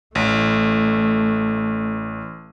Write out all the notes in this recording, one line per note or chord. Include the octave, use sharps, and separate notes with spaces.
A1 A3